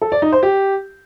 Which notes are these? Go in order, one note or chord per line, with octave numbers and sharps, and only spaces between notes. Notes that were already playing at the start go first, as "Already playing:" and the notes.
A4
D5
D#4
C5
G4